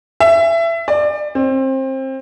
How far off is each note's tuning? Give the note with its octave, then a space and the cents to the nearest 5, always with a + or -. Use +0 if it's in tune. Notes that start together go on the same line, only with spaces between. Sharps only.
E5 +25
D5 +30
C4 +25